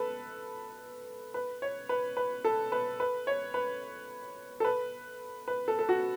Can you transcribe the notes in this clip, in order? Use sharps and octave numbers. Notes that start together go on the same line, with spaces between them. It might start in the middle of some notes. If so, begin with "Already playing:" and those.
Already playing: A4 B4
B4
C#5
B4
B4
A4
B4
B4
C#5
B4
A4
B4
B4
A4
A4
F#4